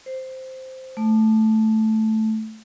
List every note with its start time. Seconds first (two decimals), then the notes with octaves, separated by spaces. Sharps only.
0.06 C5
0.97 A3